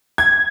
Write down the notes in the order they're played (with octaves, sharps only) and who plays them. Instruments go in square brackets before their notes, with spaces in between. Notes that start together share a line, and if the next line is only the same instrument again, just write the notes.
[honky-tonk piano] G#6